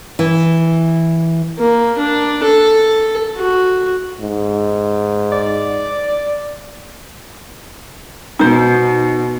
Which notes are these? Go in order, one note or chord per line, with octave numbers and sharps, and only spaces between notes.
E3
A#3
D4
A4
F#4
G#2
D5
B2 D#4 C5